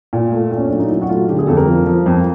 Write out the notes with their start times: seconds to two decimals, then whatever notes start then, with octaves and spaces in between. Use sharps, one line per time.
0.13 A#2
0.32 A3
0.52 A#2
0.58 C#4
0.68 F#3 D4
0.79 D#4
0.89 F#3 E4
1.02 F#4
1.09 A3 F4
1.28 D3 G4
1.39 G#4
1.47 F2 A4
1.57 A#4
1.67 F3
1.86 F3
2.06 F2